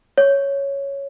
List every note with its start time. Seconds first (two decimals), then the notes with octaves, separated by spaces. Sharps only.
0.18 C#5